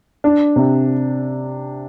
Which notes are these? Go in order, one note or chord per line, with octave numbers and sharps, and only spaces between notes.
D4
C3